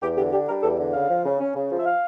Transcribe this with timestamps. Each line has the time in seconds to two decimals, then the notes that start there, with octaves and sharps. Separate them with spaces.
0.01 E2 G4
0.17 D3 G4
0.32 D4 G4
0.47 G3 A#4
0.63 E2 A4
0.78 D3
0.93 C#3 F5
1.09 F3
1.24 C#3
1.39 C#4
1.55 C#3
1.70 F3
1.78 E5
1.85 F5